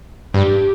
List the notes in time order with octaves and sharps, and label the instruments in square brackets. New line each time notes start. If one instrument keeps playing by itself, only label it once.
[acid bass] G2 [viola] G4